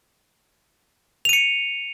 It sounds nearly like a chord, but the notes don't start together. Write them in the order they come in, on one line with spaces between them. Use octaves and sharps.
F7 D#7 C#7